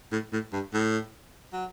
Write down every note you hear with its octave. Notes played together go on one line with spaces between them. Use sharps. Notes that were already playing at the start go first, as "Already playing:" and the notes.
A2
A2
G2
A2
F#3